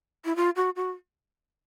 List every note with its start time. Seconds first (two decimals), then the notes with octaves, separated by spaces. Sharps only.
0.25 E4
0.36 F4
0.56 F#4
0.76 F#4